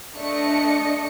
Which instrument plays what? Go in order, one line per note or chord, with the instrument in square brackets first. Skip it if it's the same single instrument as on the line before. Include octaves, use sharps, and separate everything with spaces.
[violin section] A3 D4 D#5 C#7